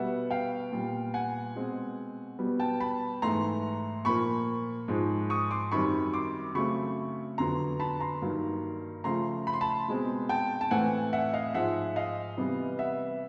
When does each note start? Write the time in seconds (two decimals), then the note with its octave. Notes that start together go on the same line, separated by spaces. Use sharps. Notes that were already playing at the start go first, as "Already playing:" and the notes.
Already playing: B2 G3 B3 E5 F#5
0.31 F5 G5
0.72 A#2 G3 B3
1.14 F#5 G#5
1.55 B2 G#3 C4
2.39 B2 G3 B3
2.60 G5 A5
2.80 A5 B5
3.22 G#2 E3 A3 A#5 C6
4.05 A#2 F3 A#3 B5 C#6
4.88 G#2 F3 G#3
5.30 C#6 D#6
5.51 C6 D6
5.72 F#2 D#3 G3 C4 B5 C#6
6.14 C6 D6
6.55 C#3 F#3 A3 C4 B5 C#6
7.38 F2 D3 F#3 B3 A#5 C6
7.80 A5 B5
8.00 A#5 C6
8.22 G2 D#3 F#3 A#3
9.04 C#3 F3 A3 A#5 C6
9.47 B5
9.53 C6
9.61 A5 B5
9.88 B2 G#3 C4
10.29 G5 A5
10.61 A5
10.71 A2 E3 A3 C4 F#5 G#5
11.13 E5 F#5
11.34 D#5 F5
11.54 G#2 F3 G#3 E5 F#5
11.96 D#5 F5
12.37 C3 E3 G3 B3
12.79 E5 F#5